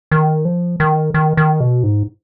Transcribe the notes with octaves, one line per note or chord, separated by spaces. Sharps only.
D#3
F3
D#3
D#3
D#3
B2
G#2